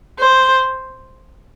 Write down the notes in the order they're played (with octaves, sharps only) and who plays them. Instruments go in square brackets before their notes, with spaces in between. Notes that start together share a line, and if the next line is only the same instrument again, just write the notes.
[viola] C5